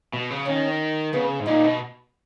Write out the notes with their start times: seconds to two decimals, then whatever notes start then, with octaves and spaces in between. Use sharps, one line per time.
0.13 B2
0.30 C#3
0.47 D#3 C#4
1.13 C#3 B3
1.40 G#2
1.47 A#2 D#4
1.64 B2